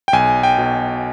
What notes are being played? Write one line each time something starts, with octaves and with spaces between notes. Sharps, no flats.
G5
B1 G#5
G5
B2